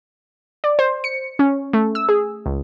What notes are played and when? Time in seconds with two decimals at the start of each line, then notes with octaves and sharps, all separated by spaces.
0.64 D5
0.79 C5
1.04 C#7
1.39 C#4
1.73 A3
1.95 E6
2.09 G#4
2.46 C#2